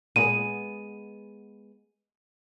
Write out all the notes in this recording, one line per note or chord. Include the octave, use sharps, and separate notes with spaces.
A#2 G#3 B3 G#4 D#7